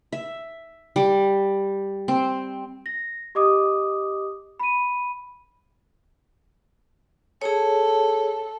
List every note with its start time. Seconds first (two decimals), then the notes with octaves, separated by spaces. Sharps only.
0.12 E5
0.96 G3
2.08 C4
2.86 A#6
3.35 G4 D#5 D6 D#6
4.60 B5 D#7
7.42 G#4 A4 C#5